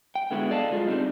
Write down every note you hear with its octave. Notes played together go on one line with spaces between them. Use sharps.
G5
G2 D3 G#3 B3 E4 F#4
A4 D5 D#5 F5 A5
F#3 G#3 F4 G#4
D#3 G3 A#3 C4 D4 D#4